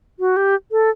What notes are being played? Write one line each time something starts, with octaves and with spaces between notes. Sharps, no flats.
F#4
G4
A4